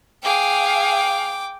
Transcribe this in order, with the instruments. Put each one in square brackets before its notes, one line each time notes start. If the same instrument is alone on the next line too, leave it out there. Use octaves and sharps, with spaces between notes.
[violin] G#4 F5 [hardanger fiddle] G5 D6